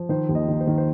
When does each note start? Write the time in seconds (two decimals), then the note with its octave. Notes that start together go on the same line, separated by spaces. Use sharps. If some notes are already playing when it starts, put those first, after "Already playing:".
Already playing: F3
0.09 D#3 C5
0.29 D#2
0.35 D#5
0.48 D#3
0.61 C5
0.67 D#3
0.78 C5